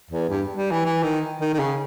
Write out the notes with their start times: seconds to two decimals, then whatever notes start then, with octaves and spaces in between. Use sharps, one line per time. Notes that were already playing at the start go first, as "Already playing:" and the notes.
0.11 E2
0.29 G2
0.57 G3
0.71 E3
0.85 E3
1.03 D#3
1.41 D#3
1.54 D#3
1.60 C#3